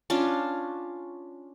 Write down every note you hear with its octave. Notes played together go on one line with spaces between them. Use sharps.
C#4 D4 F4